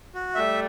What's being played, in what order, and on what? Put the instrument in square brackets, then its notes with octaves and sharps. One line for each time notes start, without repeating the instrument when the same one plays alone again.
[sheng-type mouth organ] F#4
[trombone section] G3 A3 [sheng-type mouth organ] E5